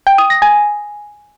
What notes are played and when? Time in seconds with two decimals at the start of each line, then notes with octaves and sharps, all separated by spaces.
0.07 G5
0.18 D#6
0.30 A#6
0.42 G#5